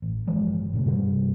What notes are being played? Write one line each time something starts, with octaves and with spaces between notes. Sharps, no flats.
A1
G1 E3 F3 G#3
A#2 C#3 A3
G2 C3 G3